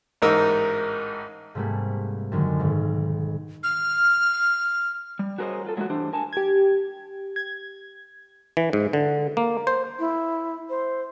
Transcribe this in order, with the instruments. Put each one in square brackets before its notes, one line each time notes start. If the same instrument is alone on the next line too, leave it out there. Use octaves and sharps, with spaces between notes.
[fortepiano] A1 G#2 D#4 A#4 E6
[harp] G#2 C3 G3 A3 A#3 G#4
F#2 D3 D#3 G#3
B1 G#2
[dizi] F6
[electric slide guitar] G3
F#4 G#4 A#4 C5 C#5 D#5
F#3 F4 A4
F#3 G#3 A3 F4 F#4
G2 E3 D4 G4 C5
A#4 G#5 A5
[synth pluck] G4 G#6
G#6
[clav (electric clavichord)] E3
G#2
D3
A#3
C5
[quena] E4
C5